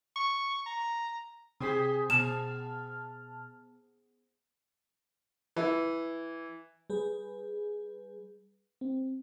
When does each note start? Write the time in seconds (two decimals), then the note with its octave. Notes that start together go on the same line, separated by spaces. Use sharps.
0.16 C#6
0.66 A#5
1.60 C3 G4 G#4 C5 B6
2.10 B2 B3 A5 F6 E7
5.56 E3
6.90 G3 G#4 B4
8.81 C4